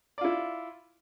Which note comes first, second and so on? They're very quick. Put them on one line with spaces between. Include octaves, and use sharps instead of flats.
D5 F4 E4